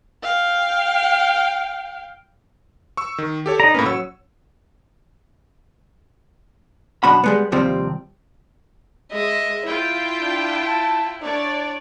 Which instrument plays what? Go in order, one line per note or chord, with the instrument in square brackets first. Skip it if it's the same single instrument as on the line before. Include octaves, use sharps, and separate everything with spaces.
[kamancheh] F5 G5
[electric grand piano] C#6 E6
D#3
G4 A4 C#5
[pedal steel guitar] D#4 A#5 [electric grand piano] D5
[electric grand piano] A2 A#3 C#4 [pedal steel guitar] B4
[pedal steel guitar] F#3 C#5 [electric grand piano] E6
[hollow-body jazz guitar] F#2 B2 D4 F#4 B5
G3 G#3 B3
D#2 C3 F3 G3 C4
[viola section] G#3 [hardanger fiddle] D#5 E5
[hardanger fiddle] E4 [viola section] F4 G5
[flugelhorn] D4
A5
[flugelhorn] D4 [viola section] C#5 D5